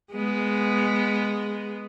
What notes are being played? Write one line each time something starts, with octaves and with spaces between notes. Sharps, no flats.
G#3 B3